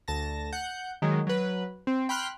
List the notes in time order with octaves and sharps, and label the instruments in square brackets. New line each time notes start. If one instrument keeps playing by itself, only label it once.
[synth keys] D2 A5 A#6
F#5 G6
D#3 F#3 G#3
F#3 B4
C4
G5 B5 C6 F6 F#6